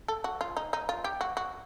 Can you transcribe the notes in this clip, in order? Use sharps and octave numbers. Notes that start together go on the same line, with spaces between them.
A4
F#4
F4
D#4
D#4
F4
G4
F#4
F#4